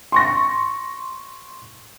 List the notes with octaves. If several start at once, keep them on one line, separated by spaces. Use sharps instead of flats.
C6 C#6 A#6